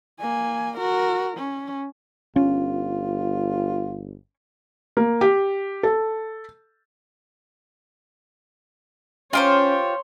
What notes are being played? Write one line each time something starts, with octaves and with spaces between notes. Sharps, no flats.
A#3 G#5
F#4 A#4
C#4
G1 C#4 F4
A#3
G4
A4
C#4 F4 G4 C5 C#5 C6